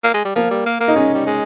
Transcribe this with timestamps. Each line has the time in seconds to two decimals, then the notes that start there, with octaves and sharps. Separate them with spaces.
0.04 A#3
0.14 G#3
0.25 G3
0.36 F3 A#3
0.51 G3
0.66 A#3
0.81 A#3
0.88 D#4
0.96 G#3 C#4
1.14 G3
1.27 G#3